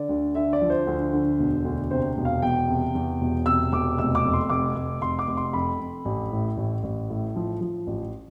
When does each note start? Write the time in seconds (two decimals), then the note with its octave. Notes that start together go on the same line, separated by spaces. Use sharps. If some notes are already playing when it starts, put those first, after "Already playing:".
Already playing: D3 D5
0.09 D2
0.35 D3 E5
0.53 D5
0.62 F3
0.70 C5
0.87 D2
1.13 D3
1.39 E1
1.64 D2
1.91 C3 C5
2.17 E1
2.25 F5
2.42 E2 G5
2.68 C3
2.95 E2
3.21 E1
3.46 C3 E6
3.72 E1 D6
3.98 F1 E6
4.15 D6
4.24 F2
4.33 C6
4.50 F1 D6
4.76 F1
5.01 F1 C6
5.19 D6
5.27 F1
5.37 C6
5.53 F2 B5
5.79 F2
6.05 A1
6.32 A2
6.57 A1
6.83 A1
7.10 A2
7.36 F3
7.61 F3
7.87 A1